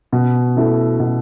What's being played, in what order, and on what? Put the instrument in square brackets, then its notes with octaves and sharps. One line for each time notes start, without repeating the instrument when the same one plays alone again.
[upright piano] B2
A3 E4 A4
B2